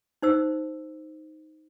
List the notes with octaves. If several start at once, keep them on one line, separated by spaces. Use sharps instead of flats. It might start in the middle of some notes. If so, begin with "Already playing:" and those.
D#4 C5 E6